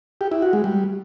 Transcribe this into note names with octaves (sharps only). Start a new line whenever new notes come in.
G4
E4
F#4
G#3
G3